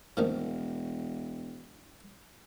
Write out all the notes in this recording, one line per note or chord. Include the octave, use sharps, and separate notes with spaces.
E1 D#2 D#3 F3